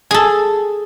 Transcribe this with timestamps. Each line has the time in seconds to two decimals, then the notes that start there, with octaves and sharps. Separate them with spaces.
0.11 G#4 A4